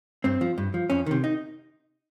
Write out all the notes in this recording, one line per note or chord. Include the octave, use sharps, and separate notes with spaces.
G2 C4
F3
G2
F3
F2 C#4
C3 D#3
D#4